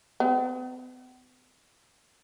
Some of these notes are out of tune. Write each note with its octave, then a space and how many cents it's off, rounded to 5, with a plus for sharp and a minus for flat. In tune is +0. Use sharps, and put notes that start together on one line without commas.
B3 +45